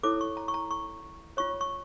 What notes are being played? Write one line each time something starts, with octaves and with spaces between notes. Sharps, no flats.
E4 A4 C#5 D6
C#6
A#5
C#6
A#5
C#6
F4 C#5 C#6
C#6